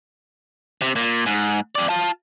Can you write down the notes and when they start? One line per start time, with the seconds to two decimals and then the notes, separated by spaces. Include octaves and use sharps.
0.82 C3
0.96 A#2
1.26 G#2
1.75 F2 D5
1.89 F4 A5